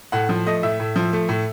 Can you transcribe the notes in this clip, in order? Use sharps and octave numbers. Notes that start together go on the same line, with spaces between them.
A2 F#5
F3
A3 D#5
A2 E5
A2
F3
A3
A2